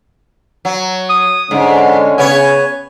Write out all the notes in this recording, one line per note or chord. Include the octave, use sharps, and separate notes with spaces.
F#3
D#6
G#2 D3 G#3 C#4
C#3 B3 C#5 G#5